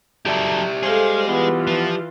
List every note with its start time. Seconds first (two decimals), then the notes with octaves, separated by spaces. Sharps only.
0.26 F#3 G4 A4 D5 E5
0.83 G#3 G#4 A4 C5 F5
1.27 E3 B3 F4
1.67 F3